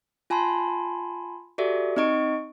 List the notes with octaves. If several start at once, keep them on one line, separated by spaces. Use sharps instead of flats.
F4 G#5 A5 B5 C6
F#4 G4 A4 D5 E5
C4 D#4 D#5 C#6 D7